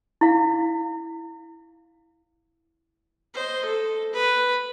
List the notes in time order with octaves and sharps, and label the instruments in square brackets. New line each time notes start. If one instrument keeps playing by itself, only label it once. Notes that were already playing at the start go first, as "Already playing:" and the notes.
[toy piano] E4 F5
[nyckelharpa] C5 D#5
A4
B4